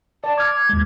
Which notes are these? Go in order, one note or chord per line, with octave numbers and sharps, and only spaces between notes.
D5 A5
D6 F6 G#6
D#2 G#3